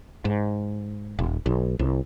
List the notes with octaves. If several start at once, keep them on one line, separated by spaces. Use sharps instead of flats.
G#2
D#1
B1
C2